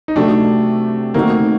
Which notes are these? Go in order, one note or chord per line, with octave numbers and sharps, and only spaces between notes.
D#4
C3 F#3 A3 D4
D#3 A3 A#3 C4 D#4 F#4